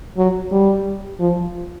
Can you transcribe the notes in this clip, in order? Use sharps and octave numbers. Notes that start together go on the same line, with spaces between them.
F#3
G3
F3